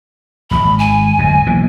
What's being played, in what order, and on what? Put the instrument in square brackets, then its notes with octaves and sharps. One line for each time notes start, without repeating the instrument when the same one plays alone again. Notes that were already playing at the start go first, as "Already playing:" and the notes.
[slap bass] D#1 G#1 [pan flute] B5
[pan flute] G#5
[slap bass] D1 F2
B1 E3 A#3